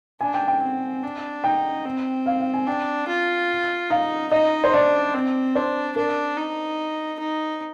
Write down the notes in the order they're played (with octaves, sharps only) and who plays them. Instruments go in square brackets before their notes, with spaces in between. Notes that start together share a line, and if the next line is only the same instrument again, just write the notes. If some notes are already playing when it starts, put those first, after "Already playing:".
[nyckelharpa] D4 [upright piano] G#5
[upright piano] G5
G5
[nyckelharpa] C4
D4
[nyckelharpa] D#4 [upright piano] G5
[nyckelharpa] C4
[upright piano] F5
F5
G#5
[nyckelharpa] D4 [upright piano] G5
[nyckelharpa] F4
[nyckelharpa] D#4 [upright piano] F5
[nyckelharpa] D#4 [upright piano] D#5
[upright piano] C5
[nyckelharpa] D4 [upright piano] D5
[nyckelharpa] C4
[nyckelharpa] D4 [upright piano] C5
[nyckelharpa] D4 [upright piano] A#4
[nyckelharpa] D#4
D#4